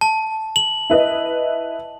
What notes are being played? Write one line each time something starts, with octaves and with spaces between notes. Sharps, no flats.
A5
F#7
E4 B4 D#5